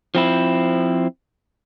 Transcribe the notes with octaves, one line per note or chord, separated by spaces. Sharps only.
F3 C4 E4